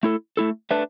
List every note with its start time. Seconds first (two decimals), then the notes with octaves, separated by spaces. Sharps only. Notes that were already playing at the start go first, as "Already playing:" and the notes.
0.03 A3 E4 A4
0.37 A3 E4 A4
0.71 A3 D4 B4 E5